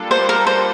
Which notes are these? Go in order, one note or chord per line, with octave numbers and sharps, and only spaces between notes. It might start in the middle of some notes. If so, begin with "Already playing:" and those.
Already playing: G3 A#3 D4 F4 A4
C5
A#4
C5